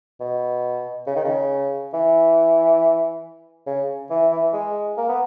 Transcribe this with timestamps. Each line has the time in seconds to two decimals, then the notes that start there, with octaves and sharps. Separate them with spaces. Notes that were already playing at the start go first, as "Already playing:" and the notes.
0.20 B2
1.07 C#3
1.16 D#3
1.25 C#3
1.94 E3
3.66 C#3
4.10 E3
4.32 E3
4.53 G#3
4.97 A#3
5.09 B3